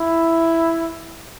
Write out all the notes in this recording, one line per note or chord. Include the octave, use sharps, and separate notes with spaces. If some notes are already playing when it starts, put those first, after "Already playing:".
Already playing: E4